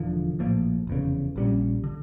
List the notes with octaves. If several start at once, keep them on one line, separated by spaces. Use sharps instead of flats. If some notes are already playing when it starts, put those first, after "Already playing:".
Already playing: E1 E2 D3 F3
A#1 A2 F3 A#3
F1 E2 C#3
A#1 A#2 G3 C#4
D3